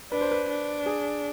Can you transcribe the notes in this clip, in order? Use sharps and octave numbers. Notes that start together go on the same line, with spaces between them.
D4 B4
C5
B4
D4
G#4